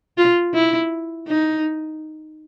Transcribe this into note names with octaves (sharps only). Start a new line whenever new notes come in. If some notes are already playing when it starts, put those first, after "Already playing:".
F4
E4
D#4